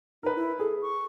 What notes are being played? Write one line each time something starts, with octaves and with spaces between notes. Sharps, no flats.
D#4 A#4 B4
E4
G#4 A4
C#6